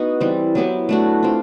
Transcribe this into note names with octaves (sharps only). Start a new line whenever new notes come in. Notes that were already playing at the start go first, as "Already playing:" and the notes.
Already playing: B3 D#4 F#4
E3 G3 C4
F#3 B3 E4 G4
A3 D4 F#4
C4 F4